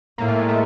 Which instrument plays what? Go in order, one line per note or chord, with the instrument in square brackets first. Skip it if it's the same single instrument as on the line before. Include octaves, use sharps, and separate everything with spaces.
[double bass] A2 [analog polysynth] A#3
[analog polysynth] A3
G#3
A3